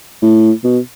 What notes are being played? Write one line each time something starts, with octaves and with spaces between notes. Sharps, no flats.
A2
B2